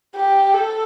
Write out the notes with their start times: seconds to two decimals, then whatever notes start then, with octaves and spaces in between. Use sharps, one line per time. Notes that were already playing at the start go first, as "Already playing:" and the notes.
0.15 G4
0.54 A4